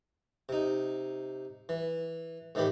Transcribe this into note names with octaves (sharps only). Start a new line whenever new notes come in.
C3 D#4
E3
A2 D#3 E3 G4 B5